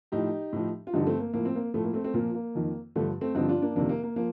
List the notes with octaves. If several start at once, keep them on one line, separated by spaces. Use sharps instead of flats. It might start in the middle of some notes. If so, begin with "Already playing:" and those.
A2 F3 D#4 G4
A2 F3
F4
G2 D3 F3 D#4 G4
A3 C4
A#3
A2 F3 A#3
C4
A#3
A2 F3 A3
A#3
A3 C4
A3 C4
A#2 F3 A#3
A#3
F2 D#3
G2 D3 F3 A3
A3 C4
G2 D3 F3 C4 D#4
D4 F4
A#3 D4
F2 C3 D#3 A#3 D4
A#3
A#3
F3 A#3